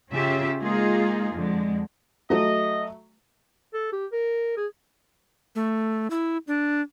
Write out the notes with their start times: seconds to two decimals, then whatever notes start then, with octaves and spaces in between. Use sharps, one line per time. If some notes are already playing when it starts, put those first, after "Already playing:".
0.13 C#3 C#4 F4 G4 E5
0.60 G#3 A#3 D#4 F4 G#4
1.33 F2 D3 G#3
2.30 F#3 A3 D#5
3.74 A4
3.92 G4
4.12 A#4
4.57 G#4
5.55 A3
6.10 E4
6.47 D4